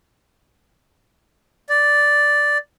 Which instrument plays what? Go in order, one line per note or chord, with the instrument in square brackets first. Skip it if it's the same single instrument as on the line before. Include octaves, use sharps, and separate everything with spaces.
[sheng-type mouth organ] D5